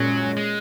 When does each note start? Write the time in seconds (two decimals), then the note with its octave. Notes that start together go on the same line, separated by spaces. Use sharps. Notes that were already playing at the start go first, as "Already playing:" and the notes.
Already playing: A#2 F#3 G#3 C#4
0.37 G#3